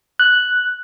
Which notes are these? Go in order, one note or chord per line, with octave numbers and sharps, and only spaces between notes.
F#6